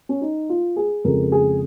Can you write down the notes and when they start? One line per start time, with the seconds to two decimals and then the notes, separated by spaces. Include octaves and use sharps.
0.09 C#4
0.21 D#4
0.49 F4
0.76 G#4
1.04 F2 C#3 G#3 A#4
1.32 G#4